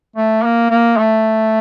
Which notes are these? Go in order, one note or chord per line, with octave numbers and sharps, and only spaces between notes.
A3
A#3
A#3
A3